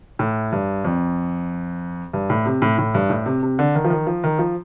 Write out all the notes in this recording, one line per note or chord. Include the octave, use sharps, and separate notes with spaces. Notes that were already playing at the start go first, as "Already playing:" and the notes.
A2
G2
F2
G2
A2
C3
A2
A2
G2
A2
C3
C3
D3
D#3
F3
D#3
F3
D#3
F3